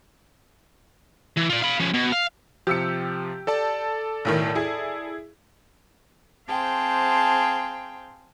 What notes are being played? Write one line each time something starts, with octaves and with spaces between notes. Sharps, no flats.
E3
F4 D5
F5 B5
F3 C#4
B2
F5
C3 F3 G4 E6 C#7
A4 D5 A5
B1 A2 D#3
E4 G#4
C4 G#4 C5 F5 G5 A5